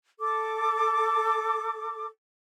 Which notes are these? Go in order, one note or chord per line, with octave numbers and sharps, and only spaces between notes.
A4 D6